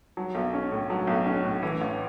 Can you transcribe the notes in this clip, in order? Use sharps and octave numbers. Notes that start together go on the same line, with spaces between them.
F#3
B1
C#4
A2
F#3
B1
C#4
A2
E3
A1